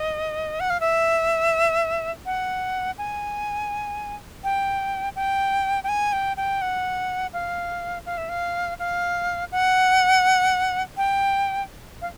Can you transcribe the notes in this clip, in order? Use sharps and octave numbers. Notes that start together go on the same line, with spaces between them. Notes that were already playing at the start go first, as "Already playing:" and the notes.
Already playing: D#5
F#5
F5
E5
F#5
G#5
G5
G5
G5
G#5
G5
G5
F#5
F5
F5
E5
F5
F5
F#5
G5
F5